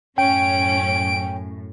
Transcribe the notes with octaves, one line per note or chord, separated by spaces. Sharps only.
F#2 A2 C#4 G5 D7